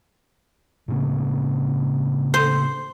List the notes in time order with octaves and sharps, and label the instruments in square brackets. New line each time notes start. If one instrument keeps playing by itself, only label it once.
[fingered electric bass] A2 C#3 A#3
[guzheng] C5